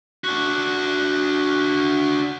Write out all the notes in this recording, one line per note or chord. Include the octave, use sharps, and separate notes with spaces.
D4 F#4